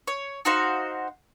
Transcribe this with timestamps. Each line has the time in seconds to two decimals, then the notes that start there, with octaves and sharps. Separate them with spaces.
0.07 C#5
0.45 D#4 F#4 C5 F5